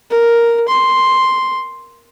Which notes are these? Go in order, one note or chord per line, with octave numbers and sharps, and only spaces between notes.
A#4
C6